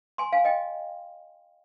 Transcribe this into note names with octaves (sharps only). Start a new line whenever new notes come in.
G#5 C6
F5 G#5
D#5 G5